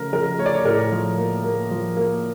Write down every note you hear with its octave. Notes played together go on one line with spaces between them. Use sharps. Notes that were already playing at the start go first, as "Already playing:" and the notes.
Already playing: C#3 F3 A3 A#4
F3 A#4
A3 C#5
D5
C#5
A2 A#4
F3
A#3
A#3
F3
A#3